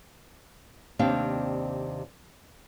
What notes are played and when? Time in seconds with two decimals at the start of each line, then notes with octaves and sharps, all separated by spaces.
0.99 D#2 C3 C4 D4 F5